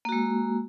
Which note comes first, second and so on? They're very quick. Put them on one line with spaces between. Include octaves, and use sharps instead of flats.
A#3 F#4 G#3